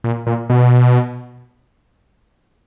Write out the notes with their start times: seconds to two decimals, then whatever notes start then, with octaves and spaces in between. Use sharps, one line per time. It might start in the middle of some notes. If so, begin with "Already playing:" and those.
0.04 A#2
0.27 A#2
0.49 B2